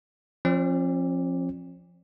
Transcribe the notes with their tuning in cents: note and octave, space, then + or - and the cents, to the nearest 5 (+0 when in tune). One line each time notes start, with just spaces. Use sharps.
F3 +0 C4 +45 D5 +0